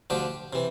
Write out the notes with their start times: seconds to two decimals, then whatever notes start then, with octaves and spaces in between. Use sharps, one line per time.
0.10 D2 D3 F3 G4
0.53 C3 E3